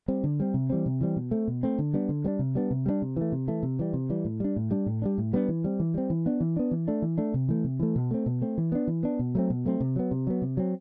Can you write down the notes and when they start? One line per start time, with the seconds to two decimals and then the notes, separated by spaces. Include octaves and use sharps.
0.08 G3 C4
0.24 D3
0.40 G3 C4
0.54 C3
0.70 E3 G3 C4
0.86 C3
1.01 E3 G3 C4
1.16 B2
1.31 A3 C4
1.48 B2
1.63 A3 C4
1.79 D3
1.94 G3 B3 D4
2.09 D3
2.24 G3 B3 D4
2.39 C3
2.55 G3 B3 D4
2.71 C3
2.86 G3 B3 D4
3.02 C3
3.16 E3 A3
3.32 C3
3.48 E3 A3
3.63 C3
3.79 E3 G3
3.93 C3
4.10 E3 G3
4.25 A2
4.40 G3 D4
4.56 A2
4.71 G3 D4
4.86 A2
5.02 G3 B3 D4
5.18 A2
5.33 G3 B3 D4
5.49 E3
5.64 G3 C4
5.80 E3
5.94 G3 C4
6.10 E3
6.26 B3 D4
6.40 E3
6.56 B3 D4
6.71 E3
6.88 A3 D4
7.02 E3
7.18 A3 D4
7.34 C3
7.49 E3 A3
7.64 C3
7.80 E3 A3
7.96 B2
8.11 A3 C4
8.26 B2
8.42 A3 C4
8.58 E3
8.72 B3 D4
8.87 E3
9.03 B3 D4
9.19 B2
9.35 F#3 A3 C4
9.50 B2
9.65 F#3 A3 C4
9.80 C3
9.96 F#3 B3
10.11 C3
10.27 F#3 B3
10.42 C3
10.57 F#3 C4